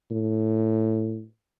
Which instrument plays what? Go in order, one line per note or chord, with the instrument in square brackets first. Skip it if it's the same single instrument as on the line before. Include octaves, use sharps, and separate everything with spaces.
[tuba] A2